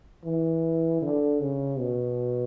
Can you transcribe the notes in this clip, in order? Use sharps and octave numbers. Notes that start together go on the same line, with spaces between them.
E3
D3
C#3
B2